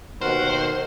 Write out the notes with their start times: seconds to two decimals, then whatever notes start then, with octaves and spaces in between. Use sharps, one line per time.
0.21 D#2 B2 D#3 F#4 A#4 C5 F#5